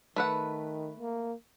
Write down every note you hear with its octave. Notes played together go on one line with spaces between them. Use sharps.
D#3 A3 B4 F#5
A#3